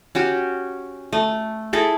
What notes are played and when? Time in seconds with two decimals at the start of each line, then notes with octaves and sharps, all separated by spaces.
0.15 C#4 F#4 G4
1.13 A3
1.73 E4 G#4 A4